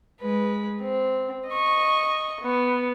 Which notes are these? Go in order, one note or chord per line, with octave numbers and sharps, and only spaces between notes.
G#3 B4
C4
D#5 C#6
B3